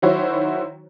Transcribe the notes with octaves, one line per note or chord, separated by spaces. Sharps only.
D#3 F#3 E4 F#4 C5 C#5